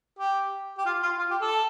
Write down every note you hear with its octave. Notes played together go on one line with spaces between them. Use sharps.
G4
G4
F4
F4
F4
G4
A4